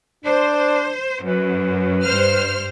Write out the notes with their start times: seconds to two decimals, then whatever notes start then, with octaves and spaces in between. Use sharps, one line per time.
0.25 D4 C5
1.24 F#2 B4
2.03 G2 C5 F6